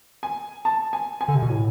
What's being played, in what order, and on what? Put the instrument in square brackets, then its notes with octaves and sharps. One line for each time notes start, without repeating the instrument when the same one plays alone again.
[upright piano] G#5
A5
G#5
G#5
[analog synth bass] D3
C3
B2
A2